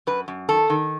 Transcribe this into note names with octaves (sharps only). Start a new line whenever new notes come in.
F#2 B4
F#2
D#3 A4
D#3